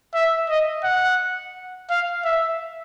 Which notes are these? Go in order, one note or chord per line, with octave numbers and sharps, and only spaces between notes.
E5
D#5
F#5
F5
E5